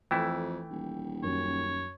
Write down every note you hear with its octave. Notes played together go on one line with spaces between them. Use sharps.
F2 E3 A3 E4 G5
D#1
F#2 C#5